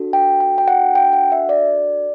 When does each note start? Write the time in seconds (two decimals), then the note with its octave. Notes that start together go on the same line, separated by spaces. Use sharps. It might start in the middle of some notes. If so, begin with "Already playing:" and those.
Already playing: D4 F#4 A4
0.13 G5
0.41 G5
0.58 G5
0.68 F#5
0.95 G5
1.13 F#5
1.32 E5
1.49 D5